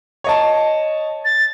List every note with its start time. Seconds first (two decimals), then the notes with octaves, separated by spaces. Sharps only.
0.24 C#5 D#5 A5
1.25 A6